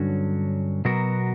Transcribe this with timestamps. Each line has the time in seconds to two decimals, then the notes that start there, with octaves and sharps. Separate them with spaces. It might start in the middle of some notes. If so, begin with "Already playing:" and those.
Already playing: G2 D3 F#3 C#4 F#4
0.85 B2 F#3 B3 F#4 A#4